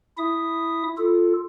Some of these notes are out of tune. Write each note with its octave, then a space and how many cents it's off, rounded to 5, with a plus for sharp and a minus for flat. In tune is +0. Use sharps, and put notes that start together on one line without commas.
E4 +0 E5 +0 D#6 +0
F4 +0 A4 +0